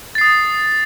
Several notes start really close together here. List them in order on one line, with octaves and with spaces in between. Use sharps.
A6 C7 D#6